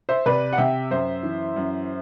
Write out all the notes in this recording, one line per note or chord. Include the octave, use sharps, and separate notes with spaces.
C5 E5
C3 B4 D5
F#5
C3 E5 G5
F#2 C5 E5
E3
F#2